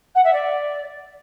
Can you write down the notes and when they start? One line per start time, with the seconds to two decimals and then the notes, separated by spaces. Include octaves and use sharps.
0.15 F#5
0.24 E5
0.33 D5